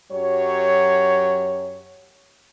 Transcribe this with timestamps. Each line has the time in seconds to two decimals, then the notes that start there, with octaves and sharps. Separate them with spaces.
0.12 F#2 F#3 G4 C#5